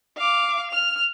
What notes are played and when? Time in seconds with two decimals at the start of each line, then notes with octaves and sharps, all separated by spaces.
0.17 F5 D6
0.71 F6 F7